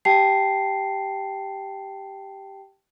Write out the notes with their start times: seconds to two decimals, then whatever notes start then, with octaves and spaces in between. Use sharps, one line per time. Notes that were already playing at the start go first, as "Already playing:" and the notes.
0.05 G4 G5 A5 C7